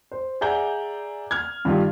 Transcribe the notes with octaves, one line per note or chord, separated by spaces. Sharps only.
C5
G#4 D5 E5 F#5 A#5 G6
F6 G#6
G2 D#3 F4 G4